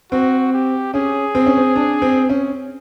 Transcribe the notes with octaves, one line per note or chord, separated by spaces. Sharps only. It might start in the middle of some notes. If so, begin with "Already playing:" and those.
C4 F#4
G4
C#4 G#4
C4
C#4
C4
D4
C4
C#4